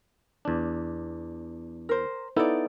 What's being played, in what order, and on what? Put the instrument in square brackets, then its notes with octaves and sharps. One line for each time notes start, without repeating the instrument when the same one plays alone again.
[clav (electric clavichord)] E2 D4
[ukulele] A#4 C5
[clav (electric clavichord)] B3 D#4 E4 [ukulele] A4 D5